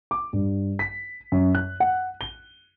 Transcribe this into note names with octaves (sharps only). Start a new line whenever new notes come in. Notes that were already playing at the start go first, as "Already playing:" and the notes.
D6
G2
B6
F#2
F#6
F#5
G7